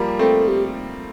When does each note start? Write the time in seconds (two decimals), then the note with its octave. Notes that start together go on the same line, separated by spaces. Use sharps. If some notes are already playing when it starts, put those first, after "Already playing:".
Already playing: F3 G3 A#3
0.19 A3 C4 A4
0.48 G4